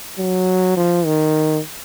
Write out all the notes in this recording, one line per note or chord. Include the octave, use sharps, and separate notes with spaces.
F#3
F3
D#3